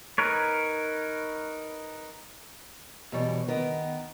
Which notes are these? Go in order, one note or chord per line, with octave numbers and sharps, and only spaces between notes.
D#4 A#4 B4 C#5
E2 B2 E3 G3 C#5
D#3 B3 A#4